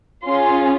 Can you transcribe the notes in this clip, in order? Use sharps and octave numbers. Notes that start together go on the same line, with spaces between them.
C#4 F4 G#4 C6